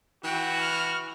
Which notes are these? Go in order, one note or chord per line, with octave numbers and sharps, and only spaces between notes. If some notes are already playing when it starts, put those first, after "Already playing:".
E3 F#4 G5
F6